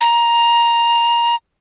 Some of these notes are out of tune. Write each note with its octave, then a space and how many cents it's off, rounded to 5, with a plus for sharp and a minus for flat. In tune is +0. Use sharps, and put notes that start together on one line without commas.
A#5 +10